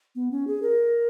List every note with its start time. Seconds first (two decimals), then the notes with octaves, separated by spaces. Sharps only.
0.15 B3
0.31 C#4
0.47 G#4
0.62 A#4